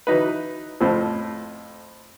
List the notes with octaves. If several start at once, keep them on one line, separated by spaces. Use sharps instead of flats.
E3 F#3 D#4 B4
F2 A2 F3